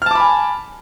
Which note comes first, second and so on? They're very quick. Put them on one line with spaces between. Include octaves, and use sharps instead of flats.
F6 A5 D6 B5 G#5